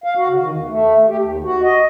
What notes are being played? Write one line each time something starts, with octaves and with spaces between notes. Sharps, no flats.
F5
F#4
C#3
D#3
E2
A3
G4
D#2
F#4
D#5